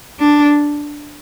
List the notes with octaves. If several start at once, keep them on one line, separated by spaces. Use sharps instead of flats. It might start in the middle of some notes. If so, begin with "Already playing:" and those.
D4